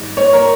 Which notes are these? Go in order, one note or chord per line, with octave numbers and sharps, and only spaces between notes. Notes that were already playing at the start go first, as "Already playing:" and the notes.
Already playing: G#2 D#3 G3
C#5
A#4